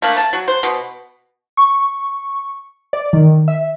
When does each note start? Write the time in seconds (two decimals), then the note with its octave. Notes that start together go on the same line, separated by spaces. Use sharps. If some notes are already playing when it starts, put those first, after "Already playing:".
0.02 A3 A#3 D4
0.18 A5
0.33 F#3 F#4
0.48 C5
0.63 B2
1.57 C#6
2.93 D5
3.13 D#3
3.48 E5